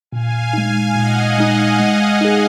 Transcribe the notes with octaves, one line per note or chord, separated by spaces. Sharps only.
A#2 F5 G#5
G#3 D#4
A#2 D#5 F#5
G#3 D#4
G#3
D#4 G#4